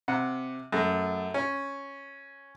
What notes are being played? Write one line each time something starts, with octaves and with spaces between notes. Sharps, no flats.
C3 F#5
F#2 A3
C#4